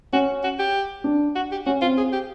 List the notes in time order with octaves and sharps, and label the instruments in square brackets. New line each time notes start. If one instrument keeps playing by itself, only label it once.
[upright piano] C#4 [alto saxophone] F#4
[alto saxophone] F#4
G4
[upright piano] D4
[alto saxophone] F#4
G4
[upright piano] C#4 [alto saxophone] F#4
[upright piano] C4 [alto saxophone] F4
[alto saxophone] G#4
G4